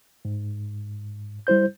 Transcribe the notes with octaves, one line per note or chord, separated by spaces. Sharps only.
G#2
G3 E4 C5 G6